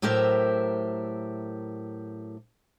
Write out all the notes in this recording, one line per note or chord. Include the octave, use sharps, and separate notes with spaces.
A2 F#3 G4 A#4 C5 E5